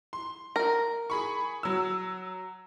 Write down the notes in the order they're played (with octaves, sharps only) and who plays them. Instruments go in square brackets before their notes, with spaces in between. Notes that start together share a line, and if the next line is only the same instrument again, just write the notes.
[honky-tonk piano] C6
[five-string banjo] A#4
[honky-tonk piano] G#4 B5 C#6
F#3 E6